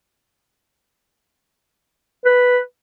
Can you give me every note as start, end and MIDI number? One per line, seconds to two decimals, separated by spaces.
2.25 2.59 71